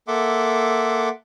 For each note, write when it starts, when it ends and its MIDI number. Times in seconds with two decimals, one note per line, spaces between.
0.08 1.09 58
0.08 1.09 69
0.08 1.09 76
0.08 1.09 78
0.08 1.09 84
0.08 1.09 86